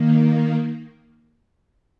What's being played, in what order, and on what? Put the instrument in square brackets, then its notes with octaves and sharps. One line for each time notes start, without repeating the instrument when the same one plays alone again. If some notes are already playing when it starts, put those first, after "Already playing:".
Already playing: [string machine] D#3 A#3